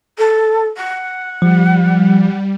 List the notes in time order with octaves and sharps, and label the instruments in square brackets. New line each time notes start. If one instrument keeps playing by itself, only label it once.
[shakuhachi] A4
F#5
[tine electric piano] F3 [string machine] G3